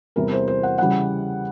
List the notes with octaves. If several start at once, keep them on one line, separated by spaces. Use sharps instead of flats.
E2 C3 E3 G3 A#4
C5
C5
F#5
C#3 E3 G3 F#5